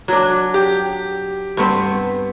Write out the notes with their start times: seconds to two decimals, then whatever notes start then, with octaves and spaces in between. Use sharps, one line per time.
0.08 F#3 D4
0.54 G4
1.57 G2 B3 C4